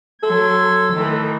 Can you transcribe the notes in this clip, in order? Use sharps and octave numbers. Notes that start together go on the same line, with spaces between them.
F#3 A4 C6 G#6
D#3 E3 A3